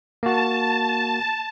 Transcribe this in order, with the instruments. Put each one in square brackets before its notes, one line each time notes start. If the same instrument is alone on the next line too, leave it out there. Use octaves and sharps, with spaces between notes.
[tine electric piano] A#3 F#4 [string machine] A5